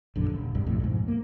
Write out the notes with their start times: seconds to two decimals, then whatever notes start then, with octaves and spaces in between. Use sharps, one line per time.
0.16 A#1 F#2 D3
0.30 D#1
0.55 C2 G2
0.66 B1 F2 A2
0.80 B1 F2 G#2
1.08 A#3